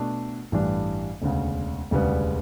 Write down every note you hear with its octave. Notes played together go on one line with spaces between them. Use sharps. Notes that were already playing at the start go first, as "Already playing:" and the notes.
Already playing: B2 A3 D4
A1 G2 E3 G3 D4
E1 D2 C#3
E1 D2 C#3 G3 B3